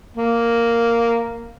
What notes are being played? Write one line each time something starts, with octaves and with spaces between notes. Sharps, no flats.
A#3